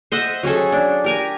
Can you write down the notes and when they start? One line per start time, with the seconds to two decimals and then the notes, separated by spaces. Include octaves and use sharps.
0.12 C5 D#5 E5 F#5
0.43 F#3 C#4 G#4 A4
0.72 D4
1.04 G4 A#4 G#5